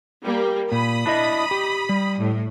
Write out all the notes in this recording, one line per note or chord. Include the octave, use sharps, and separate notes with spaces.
G3 A#3
A#2 B5 D#6
D4 E4 D#5
G4
G3
A2